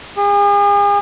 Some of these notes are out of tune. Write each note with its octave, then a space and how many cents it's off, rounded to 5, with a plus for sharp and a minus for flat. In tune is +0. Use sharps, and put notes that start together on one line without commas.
G#4 -40